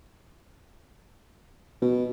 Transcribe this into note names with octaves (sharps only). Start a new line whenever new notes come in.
B2